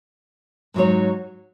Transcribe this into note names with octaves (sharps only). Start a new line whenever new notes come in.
G#2 F#3 D#4 F#4 C#5